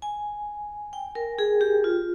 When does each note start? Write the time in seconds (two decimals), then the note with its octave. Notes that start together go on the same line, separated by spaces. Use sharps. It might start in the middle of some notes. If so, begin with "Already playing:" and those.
0.02 G#5
0.93 G5
1.15 A#4
1.39 G#4
1.61 G4
1.84 F4